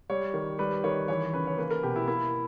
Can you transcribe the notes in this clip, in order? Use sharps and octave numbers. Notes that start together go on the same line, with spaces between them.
G3 C#5
D#3
G3 B4
D#3 C#5
E3 C#5
C#3 B4
C#5
A#3 B4
A#4
B2 G4
E4
A#3 E4